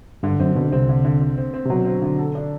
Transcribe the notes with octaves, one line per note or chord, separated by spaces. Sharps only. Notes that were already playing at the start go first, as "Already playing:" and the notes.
G2 D3
F#2 C4
B2 D3
C2 C3 C4
D3
D3
D3
C4
C4
C3
B2 F#3
C4
D3
A4
D4